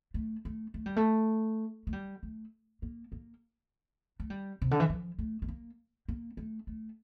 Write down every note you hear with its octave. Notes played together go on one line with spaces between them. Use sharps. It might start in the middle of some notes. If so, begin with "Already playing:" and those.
A3
A3
A3
G3
A3
A3
G3
A3
A#3
A#3
A3
G3
C3
D3
E3
F3
A3
A3
A#3
A#3
A3
A3